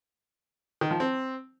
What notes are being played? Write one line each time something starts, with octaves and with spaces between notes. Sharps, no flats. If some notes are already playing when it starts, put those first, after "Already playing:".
D#3
F3
C4